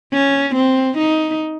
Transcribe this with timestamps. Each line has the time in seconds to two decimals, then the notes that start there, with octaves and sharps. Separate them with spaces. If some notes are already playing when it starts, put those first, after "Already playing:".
0.13 C#4
0.55 C4
0.98 D#4